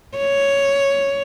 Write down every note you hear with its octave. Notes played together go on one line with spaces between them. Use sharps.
C#5